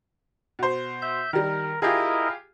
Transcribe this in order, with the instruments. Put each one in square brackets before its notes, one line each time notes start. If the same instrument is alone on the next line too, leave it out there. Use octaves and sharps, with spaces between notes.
[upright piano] B2 C5
[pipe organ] E5 G6
[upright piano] D#3 G3 [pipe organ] A#4
[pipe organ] E4 A#4 D#5 [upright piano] F4 G4 G#4